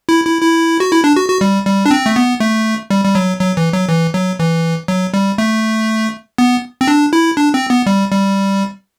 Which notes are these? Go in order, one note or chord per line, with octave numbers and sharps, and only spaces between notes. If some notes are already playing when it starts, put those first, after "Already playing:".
E4
E4
E4
F#4
E4
D4
F#4
F#4
G3
G3
D4
C4
A3
B3
A3
G3
G3
F#3
F#3
E3
F#3
E3
F#3
E3
F#3
G3
A3
B3
C4
D4
E4
D4
C4
B3
G3
G3